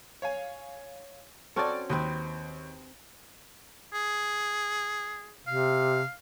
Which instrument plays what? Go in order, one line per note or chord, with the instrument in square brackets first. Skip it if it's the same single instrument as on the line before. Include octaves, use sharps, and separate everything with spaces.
[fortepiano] C#5 F5 G#5
[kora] C4 C#4 F#4 [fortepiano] A4 D5
[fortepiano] D#2 [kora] C4 B4 D#5
[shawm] G#4
[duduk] C3 [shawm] F5